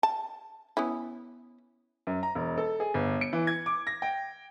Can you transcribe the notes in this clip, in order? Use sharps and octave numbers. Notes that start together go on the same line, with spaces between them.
A5
B3 C#4 E4
F#2
A#5
E1
A4
G#4
G1
C#7
E3
G#6
D6
A#6
G5